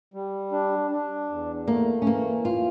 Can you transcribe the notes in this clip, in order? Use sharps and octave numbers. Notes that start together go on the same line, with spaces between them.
G3
D4
D4
E2
A3 A#3
C#4
E3 A#3
E2 F4